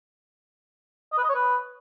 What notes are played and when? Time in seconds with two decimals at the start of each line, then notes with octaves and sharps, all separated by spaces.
1.12 D#5
1.18 B4
1.24 D#5
1.29 C#5
1.35 B4